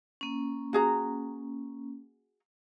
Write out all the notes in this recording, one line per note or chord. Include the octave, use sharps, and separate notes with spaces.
A#3 C#4
F#4 G#4 A#5